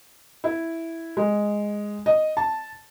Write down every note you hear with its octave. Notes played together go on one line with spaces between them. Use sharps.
E4
G#3
D#5
A5